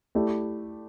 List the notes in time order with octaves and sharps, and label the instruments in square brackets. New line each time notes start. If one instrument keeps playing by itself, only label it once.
[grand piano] A3 E4 G4 D5